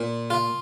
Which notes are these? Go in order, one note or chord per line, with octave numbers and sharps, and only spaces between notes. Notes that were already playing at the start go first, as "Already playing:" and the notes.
Already playing: A#2
F4